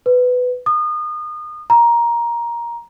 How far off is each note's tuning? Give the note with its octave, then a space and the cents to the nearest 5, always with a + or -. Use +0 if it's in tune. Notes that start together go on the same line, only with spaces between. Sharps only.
B4 +15
D#6 -30
A#5 +15